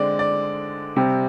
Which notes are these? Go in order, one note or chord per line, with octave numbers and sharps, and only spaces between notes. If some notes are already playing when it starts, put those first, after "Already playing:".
Already playing: D3 G#3 C4 D5
D5
C3 G3 C4